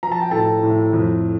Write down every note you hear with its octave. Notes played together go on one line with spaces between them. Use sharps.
F3 A#5
A5
G5
A2 A4 A5
A2
F2